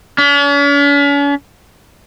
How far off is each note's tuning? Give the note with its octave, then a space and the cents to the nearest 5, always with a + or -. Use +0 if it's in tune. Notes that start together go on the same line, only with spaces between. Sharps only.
C#4 +45